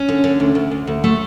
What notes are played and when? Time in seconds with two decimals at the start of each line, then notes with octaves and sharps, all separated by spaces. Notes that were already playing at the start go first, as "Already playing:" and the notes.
Already playing: C#4
0.09 D3
0.24 D3
0.40 D2
0.55 D2
0.71 D2
0.87 D2
1.04 A3